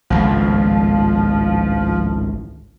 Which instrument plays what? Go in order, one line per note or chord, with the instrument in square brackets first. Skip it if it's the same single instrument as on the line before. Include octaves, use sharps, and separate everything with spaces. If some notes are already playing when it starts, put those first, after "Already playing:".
[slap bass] G#1 C#2 A2 [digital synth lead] F3